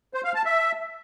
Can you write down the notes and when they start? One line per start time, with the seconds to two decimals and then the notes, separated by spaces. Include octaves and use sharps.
0.14 C5
0.24 F5
0.35 A5
0.45 E5